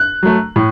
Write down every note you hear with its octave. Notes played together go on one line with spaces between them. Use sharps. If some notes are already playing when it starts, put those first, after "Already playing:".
Already playing: F#6
F#3 A3
A2